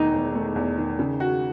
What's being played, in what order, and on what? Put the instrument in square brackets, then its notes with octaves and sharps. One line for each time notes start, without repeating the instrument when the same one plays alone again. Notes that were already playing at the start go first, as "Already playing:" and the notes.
Already playing: [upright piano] E1 E2 D#3 A3 [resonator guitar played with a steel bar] D#4
[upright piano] E1
A3
E2
D#3
C#3
F#4